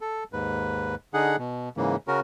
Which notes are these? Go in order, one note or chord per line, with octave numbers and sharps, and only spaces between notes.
A4
D#2 G#2 B4
D3 D#4 G#4 F#5
B2
G#2 C#3 E3 A#3
C#3 C#4 F#4 A#4